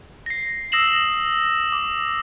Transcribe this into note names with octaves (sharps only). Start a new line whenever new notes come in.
A#6 C7
D#6 E6 A#6 C7 E7 F#7
D6